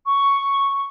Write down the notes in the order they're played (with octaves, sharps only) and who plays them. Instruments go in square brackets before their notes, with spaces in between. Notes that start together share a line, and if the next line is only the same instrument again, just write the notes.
[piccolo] C#6